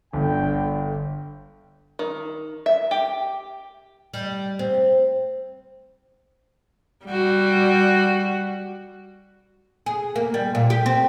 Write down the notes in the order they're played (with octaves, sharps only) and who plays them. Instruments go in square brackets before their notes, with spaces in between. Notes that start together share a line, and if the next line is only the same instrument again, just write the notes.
[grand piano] G1 [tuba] D3 [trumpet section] G5
[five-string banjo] D#3
E5
G4
[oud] G3
C4
[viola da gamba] G3 F#4
[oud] G#4
A#3
G3
A#2
G4
C4